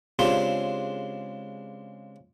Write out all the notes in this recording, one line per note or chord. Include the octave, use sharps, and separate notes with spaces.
C#3 G#3 C4 D4 F4 G4